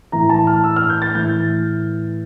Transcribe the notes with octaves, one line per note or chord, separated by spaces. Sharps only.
A2 E3 A#5
A5
F6
E6
F6
G6
A6
A2 E3 G6